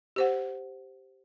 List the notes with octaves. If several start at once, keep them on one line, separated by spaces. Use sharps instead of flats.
G4 C5 F#5